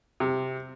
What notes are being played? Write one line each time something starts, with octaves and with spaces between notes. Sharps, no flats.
C3